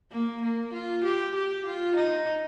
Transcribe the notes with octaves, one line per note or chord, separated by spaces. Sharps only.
A#3
A#3
F4
G4
G4
F4
D#4